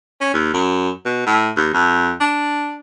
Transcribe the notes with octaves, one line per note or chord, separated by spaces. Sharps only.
C#4
D#2
F#2
B2
A2
D#2
F2
D4